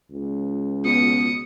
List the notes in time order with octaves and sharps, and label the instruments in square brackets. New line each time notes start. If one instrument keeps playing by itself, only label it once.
[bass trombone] C#2
[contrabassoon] B2 [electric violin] D#6 C#7